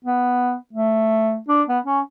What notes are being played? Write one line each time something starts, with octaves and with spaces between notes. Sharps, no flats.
B3
A3
D4
B3
C#4